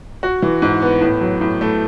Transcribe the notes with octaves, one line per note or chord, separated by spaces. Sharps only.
F#4
E3
G#2
B3
A2
F#3
A2
A3